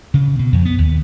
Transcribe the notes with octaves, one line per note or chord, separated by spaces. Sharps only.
C#3
B2
F2
B3
D#2